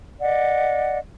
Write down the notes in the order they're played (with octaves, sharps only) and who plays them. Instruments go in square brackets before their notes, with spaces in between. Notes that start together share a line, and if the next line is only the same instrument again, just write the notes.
[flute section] D5 D#5 F#5